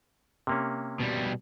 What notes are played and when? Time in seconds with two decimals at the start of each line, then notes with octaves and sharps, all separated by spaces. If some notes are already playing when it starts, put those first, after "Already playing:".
0.47 C3 A#3 C#4
1.00 B2 G3